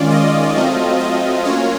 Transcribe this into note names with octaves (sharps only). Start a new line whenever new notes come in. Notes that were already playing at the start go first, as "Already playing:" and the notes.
Already playing: D#3 G#3 C#4 F4 D5
D#5
F#3 A3 C4 F4
D#5
F#3 A#3 C#4 F4 C#5